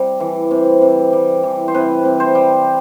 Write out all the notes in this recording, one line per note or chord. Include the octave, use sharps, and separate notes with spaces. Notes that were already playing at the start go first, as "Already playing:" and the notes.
Already playing: C3 G3
E3
C3
C3
G3
E3
C5
C3 B4
C3
C5
G3